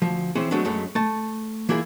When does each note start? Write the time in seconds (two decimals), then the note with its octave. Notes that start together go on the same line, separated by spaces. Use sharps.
0.02 D2 F3
0.35 E3 C4 C#4 E4 G#4 C5
0.51 F#3 G#3 A3 B3 C4 D4
0.65 F#2 F#3 G#3 A3 C#4
0.95 A3 A5
1.69 E3 A#3 E4 F4 G#4